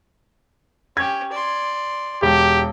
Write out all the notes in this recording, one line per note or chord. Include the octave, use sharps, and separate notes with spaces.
C#4 G4 G#6
D5 C6
E1 G4